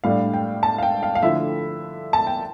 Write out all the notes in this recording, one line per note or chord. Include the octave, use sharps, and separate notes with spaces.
A2 G3 D4 F5
G5
A5
F5
G5
F5
F5
D3 F3 A3 E4 E5
A5
G5